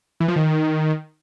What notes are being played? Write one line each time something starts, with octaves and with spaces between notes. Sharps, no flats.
E3
F3
D#3